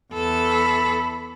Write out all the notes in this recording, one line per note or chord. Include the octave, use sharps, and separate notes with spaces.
E2 A4 B5